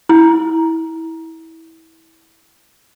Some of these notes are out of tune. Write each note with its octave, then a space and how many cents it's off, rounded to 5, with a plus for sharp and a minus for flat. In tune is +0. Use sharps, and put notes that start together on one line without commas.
E4 -20